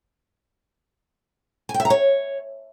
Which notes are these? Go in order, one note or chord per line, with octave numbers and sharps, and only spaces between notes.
G#5
G5
E5
A#5
C#5